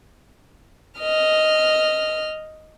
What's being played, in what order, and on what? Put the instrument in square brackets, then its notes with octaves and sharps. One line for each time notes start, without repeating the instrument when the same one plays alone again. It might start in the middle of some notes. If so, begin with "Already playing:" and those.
[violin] D#5 F6